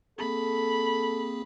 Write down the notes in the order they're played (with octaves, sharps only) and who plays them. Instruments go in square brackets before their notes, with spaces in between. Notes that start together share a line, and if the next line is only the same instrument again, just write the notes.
[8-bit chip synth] A#3 C4 G#4 [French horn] A4 [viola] B5